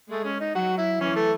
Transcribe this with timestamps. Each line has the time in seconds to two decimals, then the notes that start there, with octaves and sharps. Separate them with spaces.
0.10 G#3 A3
0.24 C#4
0.40 D#4
0.55 F#3 F#4
0.78 E4
1.01 E3 C#4
1.15 A3